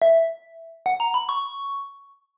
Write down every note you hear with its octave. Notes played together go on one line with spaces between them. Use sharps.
E5
F#5
A#5
B5
C#6